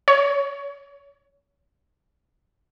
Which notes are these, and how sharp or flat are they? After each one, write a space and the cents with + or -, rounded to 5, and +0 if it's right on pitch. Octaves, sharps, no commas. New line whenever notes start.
C#5 +25